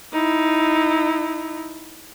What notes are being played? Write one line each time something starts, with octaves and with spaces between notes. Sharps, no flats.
D#4 E4